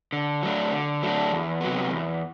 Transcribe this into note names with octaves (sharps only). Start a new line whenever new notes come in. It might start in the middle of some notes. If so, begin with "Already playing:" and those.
D3
F#3 A3 D4
D3
F#3 A3 D4
E2
C3 F#3 B3
E2